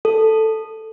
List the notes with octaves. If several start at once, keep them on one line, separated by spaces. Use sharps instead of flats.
A4